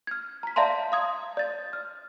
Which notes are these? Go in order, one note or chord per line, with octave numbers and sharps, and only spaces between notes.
F6 G#6
A#5 B6
D5 E5 F5 A5 A#5 C6
F5 D#6 G#6
D5 A6
F6